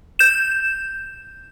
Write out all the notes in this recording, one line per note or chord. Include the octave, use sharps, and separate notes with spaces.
G6 E7